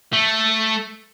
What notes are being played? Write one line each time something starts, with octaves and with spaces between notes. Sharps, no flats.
A3